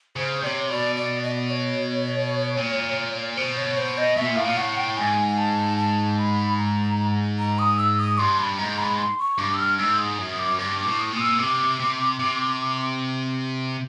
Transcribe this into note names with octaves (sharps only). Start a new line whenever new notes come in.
C#3 C5
C3 C#5 D5
B2 D5
D5
D#5
D5
C#5
A#2
B2 C5
C#5
C5
D#5
B2 E5
A#2
A2 F5
A#2
A2 F#5
G5
G#2 G#5
G#5
A5
A5
B5
A#5
A#5
D#6
E6
D#6
G2 C6
B5
G#2 A#5
B5
C6
C#6
G2 D6
E6
F6
G#2 E6
D#6
F#2 D#6
D6
G2 D6
D6
A2
D#6
A#2
E6
C3 D6
C3
C3